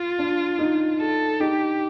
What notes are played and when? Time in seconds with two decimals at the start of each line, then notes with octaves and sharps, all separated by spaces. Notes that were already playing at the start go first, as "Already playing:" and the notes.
Already playing: F4
0.19 D4
0.59 D#4
0.99 A4
1.40 D#4 G4